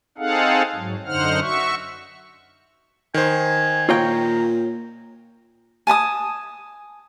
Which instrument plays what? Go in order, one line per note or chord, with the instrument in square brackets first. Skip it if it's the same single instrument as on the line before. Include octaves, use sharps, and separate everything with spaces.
[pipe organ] C4 D#4 G#4 A4 F5 F#5
G#2 F#3
F#2 D3 D#4 C5 F#5 F6
F#4 E5 C#6
[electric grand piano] D#3 C5 [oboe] G#5
[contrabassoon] A#2 [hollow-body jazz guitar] F4 C#5 G5 [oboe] A#5
[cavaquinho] G#5 A5 B5 D#6